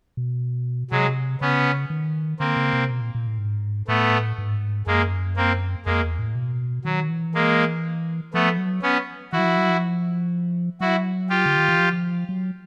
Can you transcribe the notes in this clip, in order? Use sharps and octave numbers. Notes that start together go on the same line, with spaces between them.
B2
C3 F#3 G#3
C#3 B3 C#4
D#3
D3 A#3 C4
C#3
C3
B2
A#2
A#2
A2
G#2
A2 A3 B3
G#2
F#2 G#3 A#3
A#3 C4
F2 G#3 A#3
E2
A2
B2
D#3 F#3
E3
G#3 A#3
F3 A3 B3
F#3
B3 C#4
E3 E4 F#4
F#3
F3
F#3
F3
F#3 E4 F#4
F4 G4
D3
D#3
E3
F3
F#3